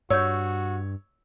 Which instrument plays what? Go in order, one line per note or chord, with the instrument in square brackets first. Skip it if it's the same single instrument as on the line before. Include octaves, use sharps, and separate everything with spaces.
[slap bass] G2 [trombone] F#4 [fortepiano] C#5 [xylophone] E6 G6